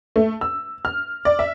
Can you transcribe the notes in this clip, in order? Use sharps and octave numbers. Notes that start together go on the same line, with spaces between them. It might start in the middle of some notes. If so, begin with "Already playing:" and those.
A3
E6
F6
D5
E5